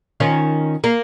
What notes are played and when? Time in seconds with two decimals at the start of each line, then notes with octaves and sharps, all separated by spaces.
0.20 D#3 C#4 F4
0.84 A#3